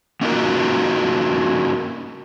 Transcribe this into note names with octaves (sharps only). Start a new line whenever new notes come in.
A#3 C#4 D#4 F4 F#4 A#4